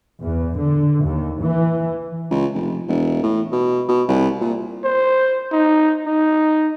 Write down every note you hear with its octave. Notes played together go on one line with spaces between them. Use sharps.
E2
D3
D#2
E3
C#2
F1
E1
A2
B2
B2
C2
A#2
C5
D#4
D#4